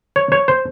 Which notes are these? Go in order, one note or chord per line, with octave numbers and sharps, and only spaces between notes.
C#5
C#5
C5